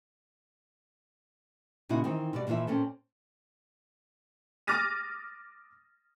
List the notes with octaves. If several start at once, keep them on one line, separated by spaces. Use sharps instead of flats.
A#2 C#3 D#4 E4 F#4
D#3 E3 C4 D#4
B2 G3 F#4 D5
A#2 E3 F3 E4 E5
A#2 C4 C#4 A4
D6 F6 A6 A#6 D#7